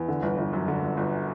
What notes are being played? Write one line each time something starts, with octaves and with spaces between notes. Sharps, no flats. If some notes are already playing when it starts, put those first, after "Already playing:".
Already playing: E2
D3
G1
G1
F#2
D3
G1
G1